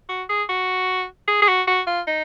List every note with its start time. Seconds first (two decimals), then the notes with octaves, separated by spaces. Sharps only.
0.09 F#4
0.29 G#4
0.49 F#4
1.28 G#4
1.42 G#4
1.48 F#4
1.68 F#4
1.87 F4
2.07 D#4